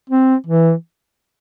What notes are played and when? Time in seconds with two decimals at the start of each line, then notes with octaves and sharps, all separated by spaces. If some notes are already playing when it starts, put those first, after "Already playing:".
0.10 C4
0.46 E3